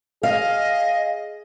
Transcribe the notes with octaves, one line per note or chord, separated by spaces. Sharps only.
G#4 D#5 F5